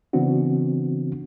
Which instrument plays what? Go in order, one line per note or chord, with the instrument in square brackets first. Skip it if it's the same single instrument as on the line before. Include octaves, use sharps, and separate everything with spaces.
[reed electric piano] C#3 E3 B3 C4 D4 F#4